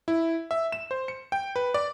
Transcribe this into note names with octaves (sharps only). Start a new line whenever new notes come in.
E4
E5
E7
C5
C#7
G5
B4
D5